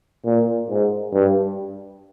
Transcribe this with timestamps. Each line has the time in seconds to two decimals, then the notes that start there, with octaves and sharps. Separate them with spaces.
0.25 A#2
0.69 G#2
1.13 G2